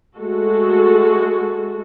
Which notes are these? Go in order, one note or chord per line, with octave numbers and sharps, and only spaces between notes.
G#3 A3 F#4 A4